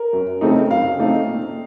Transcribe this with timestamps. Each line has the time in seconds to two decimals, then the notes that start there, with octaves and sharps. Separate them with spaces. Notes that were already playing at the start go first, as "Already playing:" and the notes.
Already playing: A#4
0.13 F#2
0.41 C#3 A3 C4 D#4
0.70 F#2 F5
0.98 C#3 A3 C4 D#4
1.27 A#2